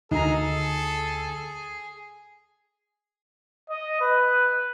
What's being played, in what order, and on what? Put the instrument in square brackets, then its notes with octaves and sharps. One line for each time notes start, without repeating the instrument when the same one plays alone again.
[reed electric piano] D2 [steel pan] D#4 A#5 [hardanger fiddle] G#4 [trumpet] A4
[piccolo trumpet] D#5
B4